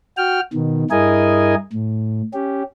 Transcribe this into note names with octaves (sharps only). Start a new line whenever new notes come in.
F#4 G5 F6
B2 D#3
G2 E4 G#4 A#4 D#5 G#5
A2
C#4 G4